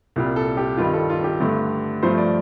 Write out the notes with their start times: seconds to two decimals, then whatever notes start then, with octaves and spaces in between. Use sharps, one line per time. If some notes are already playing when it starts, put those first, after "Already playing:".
0.16 C2 A#2 G3
0.36 A4
0.57 G4
0.77 G2 D#3 G3 F4
0.93 A4
1.10 F4
1.24 G4
1.40 G2 D3 A3
2.03 G2 F3 A3 C5
2.18 D5